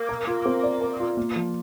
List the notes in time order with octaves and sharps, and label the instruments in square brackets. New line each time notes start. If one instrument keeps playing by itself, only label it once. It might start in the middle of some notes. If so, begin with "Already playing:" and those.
Already playing: [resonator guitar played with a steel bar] A#3
[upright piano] A#4
F4
C4
D5
A#4
F4
A#3
F3